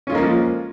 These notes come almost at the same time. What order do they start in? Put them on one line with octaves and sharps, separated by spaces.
C#4 F4 G#3 A#3 F3